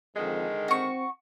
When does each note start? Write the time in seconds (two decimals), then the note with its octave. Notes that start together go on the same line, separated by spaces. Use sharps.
0.16 F2 D3 D#3 G#3
0.68 C4 F#4 C#6